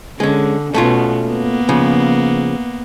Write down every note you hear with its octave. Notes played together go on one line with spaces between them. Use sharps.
D3 G#3 C#4
B2 A3 B3 C#4 F4
A#3 B3
C#3 F3